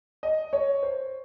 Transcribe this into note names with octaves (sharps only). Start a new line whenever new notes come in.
D#5
C#5
C5